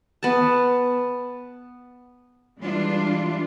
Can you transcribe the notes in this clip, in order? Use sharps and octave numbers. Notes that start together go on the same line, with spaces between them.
B3 A5
E3 G3 G#3 D4 F4